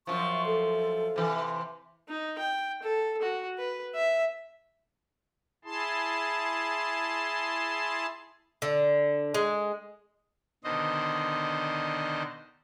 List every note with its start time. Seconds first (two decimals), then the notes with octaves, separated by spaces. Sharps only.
0.07 F#2 F3 C#6
0.46 A4
1.16 C3 E3
2.09 D#4
2.39 G5
2.83 A4
3.22 F#4
3.58 B4
3.95 E5
5.65 E4 G#4 A5 C6
8.62 D3
9.34 G#3
10.64 B2 D3 D#3 C5 D#5